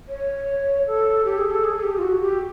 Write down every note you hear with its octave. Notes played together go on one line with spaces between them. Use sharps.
C#5
A4
G4
G#4
A4
G#4
G#4
G4
F4
F#4
G4